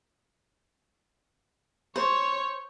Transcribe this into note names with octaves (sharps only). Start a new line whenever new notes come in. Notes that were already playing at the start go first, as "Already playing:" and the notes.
C5 C#5